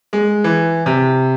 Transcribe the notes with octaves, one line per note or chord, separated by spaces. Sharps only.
G#3
E3
C3